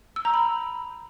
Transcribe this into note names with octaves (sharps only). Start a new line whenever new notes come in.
E6
A#5
B5